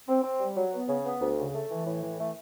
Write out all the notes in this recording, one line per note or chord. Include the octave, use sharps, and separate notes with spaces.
C4
C4
G3
F#3
B3
C#3
B3
D2
C#3
A3
E3
A2
E3
A3